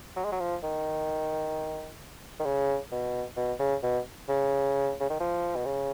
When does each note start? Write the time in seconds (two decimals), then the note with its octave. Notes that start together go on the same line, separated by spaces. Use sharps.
0.16 F#3
0.24 G#3
0.32 F#3
0.40 F3
0.63 D#3
2.40 D#3
2.46 C#3
2.92 B2
3.37 B2
3.59 C#3
3.83 B2
4.29 C#3
5.00 C#3
5.10 D#3
5.20 F3
5.55 B2
5.65 C#3